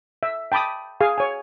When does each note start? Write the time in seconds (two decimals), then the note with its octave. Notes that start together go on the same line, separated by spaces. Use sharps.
0.23 E5
0.52 G5 A5 B5 D6 D#6
1.00 G#4 F5 G#5
1.18 C#5 G#5